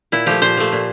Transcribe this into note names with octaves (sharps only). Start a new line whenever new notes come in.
A#2 E4
F3 A3 G4
A#2 C5
F3 A3
A#2